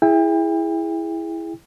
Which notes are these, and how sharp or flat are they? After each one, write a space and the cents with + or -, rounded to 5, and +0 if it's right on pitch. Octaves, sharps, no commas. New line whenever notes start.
E4 +0 G#4 +0 G5 +35